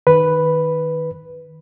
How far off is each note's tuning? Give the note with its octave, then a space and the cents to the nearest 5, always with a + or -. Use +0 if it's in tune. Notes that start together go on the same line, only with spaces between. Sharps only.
D#3 +0 B4 +0